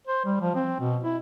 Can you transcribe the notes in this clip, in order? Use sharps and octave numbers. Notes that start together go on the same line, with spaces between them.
C5
G3
F3
C4
B2
E4